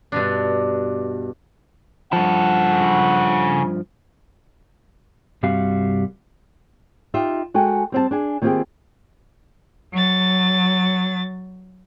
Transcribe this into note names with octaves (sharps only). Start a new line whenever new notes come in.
G2 B2 D4
G2 C#3 F3 A4 F#5
C2 G2 C3 G3 F#4 F5
D#4 F4 G4 E5
G#3 F#4 A4 G5 G#5
G3 C4 F#5 A5
D4 G#4 G#5
D#3 A#3 C4 F4 G4 G#4
F#3 A6